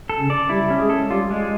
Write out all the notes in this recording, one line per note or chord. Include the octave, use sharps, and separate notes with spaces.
A4
C#3 C#4
D5
G3 E4 G4
C#4
G#3 G#4
A4
G3 F4 G4
G#3